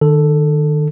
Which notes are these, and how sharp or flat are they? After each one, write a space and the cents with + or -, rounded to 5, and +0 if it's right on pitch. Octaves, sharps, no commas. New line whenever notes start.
D#3 -35 A4 +0